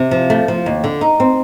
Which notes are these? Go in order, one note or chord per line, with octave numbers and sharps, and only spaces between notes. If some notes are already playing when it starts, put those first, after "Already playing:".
Already playing: C3
F3
A3
F3
D#2
D3
D#4
C4